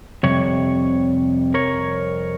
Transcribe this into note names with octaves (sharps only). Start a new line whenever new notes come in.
F2 C3 G3 C#5
A#4 C#5